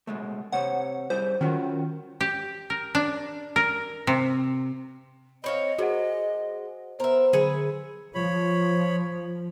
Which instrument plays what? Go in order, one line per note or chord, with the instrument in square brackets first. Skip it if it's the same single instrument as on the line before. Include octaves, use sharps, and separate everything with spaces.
[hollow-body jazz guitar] B2 G#3 A3
[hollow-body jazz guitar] C3 C5 C#5 [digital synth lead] F#5
[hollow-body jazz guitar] G3 E4 G#4 [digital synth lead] C5
[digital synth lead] D#3 [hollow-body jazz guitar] C#4 F4 F#4
[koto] G4
A#4
D4
A#4
C3
[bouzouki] C4 C#5 F5 [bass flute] D#5 [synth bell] B5
[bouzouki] G#3 [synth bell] F#4 C5 F#5
[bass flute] B3 [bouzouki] A#4 E5 [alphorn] C5
[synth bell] D3 C#7 [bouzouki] G#4 B4 E5
[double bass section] F3 [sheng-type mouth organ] C#5 B5